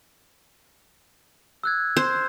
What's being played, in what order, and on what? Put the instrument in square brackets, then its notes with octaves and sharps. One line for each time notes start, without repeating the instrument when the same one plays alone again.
[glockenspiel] E6 F#6 G#6
[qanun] C5